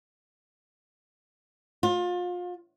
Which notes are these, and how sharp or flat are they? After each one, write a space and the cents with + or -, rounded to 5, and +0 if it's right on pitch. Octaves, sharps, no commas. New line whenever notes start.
F4 +30